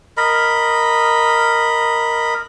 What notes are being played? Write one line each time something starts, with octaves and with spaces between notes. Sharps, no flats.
A#4 D#5 B5